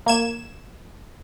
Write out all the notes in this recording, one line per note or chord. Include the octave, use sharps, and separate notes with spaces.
A#3 G#6 E7